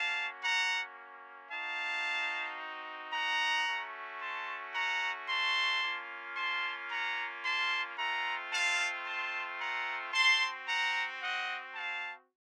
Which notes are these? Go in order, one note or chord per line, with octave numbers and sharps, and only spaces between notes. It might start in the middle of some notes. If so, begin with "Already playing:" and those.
Already playing: A#3 C#4 F#4 F5 A5
F#5 A#5
C4 D#4 F#4 F5 A5
F#5 A#5
A3 C#4 F#4
A5 C6
F#5 A#5
A5 C6
A#3 C#4 F4
A5 C6
F#5 A#5
A5 C6
A3 C4 F4 F#5 A#5
F5 A5
A5 C6
F#5 A#5
C4 F#4 A5 C6
F#5 A#5
D#5 F#5
F5 A5